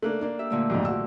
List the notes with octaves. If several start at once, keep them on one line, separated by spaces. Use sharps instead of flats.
A3 A#3 D4 F#6
A#3 D4
G4 E5
A#2 D3 A3
B1 F2 G#2 G4
F#4 E6